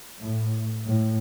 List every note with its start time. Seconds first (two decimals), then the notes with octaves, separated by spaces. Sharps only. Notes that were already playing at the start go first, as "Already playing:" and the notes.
0.18 A2
0.84 A2